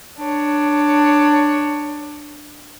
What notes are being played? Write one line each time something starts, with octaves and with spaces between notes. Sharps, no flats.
D4 C#5